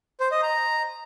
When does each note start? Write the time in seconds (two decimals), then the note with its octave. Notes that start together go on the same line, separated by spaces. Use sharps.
0.20 C5
0.31 D#5
0.43 A#5